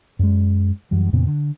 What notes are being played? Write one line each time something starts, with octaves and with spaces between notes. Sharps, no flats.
F#2 G#3
F#2 E3 G3
F2 A#2 C#3 B3
D3